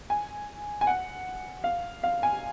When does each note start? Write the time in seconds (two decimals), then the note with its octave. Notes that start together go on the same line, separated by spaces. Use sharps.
0.10 G#5
0.81 G#5
0.87 F#5
1.64 F5
2.03 F5
2.23 G#5